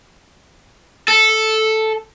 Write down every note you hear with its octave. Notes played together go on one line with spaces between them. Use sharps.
A4